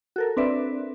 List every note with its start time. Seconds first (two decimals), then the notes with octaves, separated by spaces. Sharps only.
0.16 F#4 A4 A#4
0.37 C4 D4 B4 D5 E5